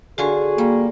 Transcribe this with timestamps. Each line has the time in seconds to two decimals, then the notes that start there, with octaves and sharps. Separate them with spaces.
0.18 D3 F4 F#4 G#4 C#5 G#5 C#6
0.58 G3 A#3